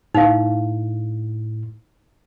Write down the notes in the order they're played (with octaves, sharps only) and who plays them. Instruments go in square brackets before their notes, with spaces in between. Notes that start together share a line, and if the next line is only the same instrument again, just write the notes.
[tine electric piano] A2 [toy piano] D#4 F5